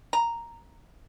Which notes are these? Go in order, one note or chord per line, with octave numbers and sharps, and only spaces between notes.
A#5